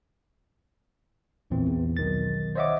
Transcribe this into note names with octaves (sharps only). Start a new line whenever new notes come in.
A#1 E2 A#2 E3 C4
E2
B1 D#3 A6
C5 C#5 D#5 E5 F#5 D6